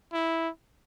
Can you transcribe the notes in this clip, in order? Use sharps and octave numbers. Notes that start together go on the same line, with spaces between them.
E4